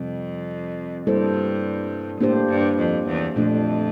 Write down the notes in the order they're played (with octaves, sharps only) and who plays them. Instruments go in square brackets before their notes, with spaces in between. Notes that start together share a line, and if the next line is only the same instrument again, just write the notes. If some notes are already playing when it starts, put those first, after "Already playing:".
Already playing: [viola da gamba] F2 [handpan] C3 G3 C4
[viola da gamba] G2 [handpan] G3 A#3 E4 A4 C5
[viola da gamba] A2 [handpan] A#3 D4 G4 C5
[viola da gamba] G2
F2
E2
[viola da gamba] F2 [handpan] A#2 A3 D4